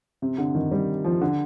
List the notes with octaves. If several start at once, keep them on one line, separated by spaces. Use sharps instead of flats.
C3
D3
D#3
G3
F3
D3